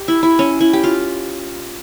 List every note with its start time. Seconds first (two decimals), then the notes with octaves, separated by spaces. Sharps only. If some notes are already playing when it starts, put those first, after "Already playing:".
Already playing: G4
0.08 E4
0.23 E4
0.39 C#4
0.60 E4
0.73 G4
0.83 F4